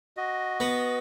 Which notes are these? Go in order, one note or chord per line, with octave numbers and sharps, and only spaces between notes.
F#4 D#5
B3